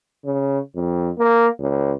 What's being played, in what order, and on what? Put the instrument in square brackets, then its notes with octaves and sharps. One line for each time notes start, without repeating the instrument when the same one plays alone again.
[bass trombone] C#3
F2
A#3
C#2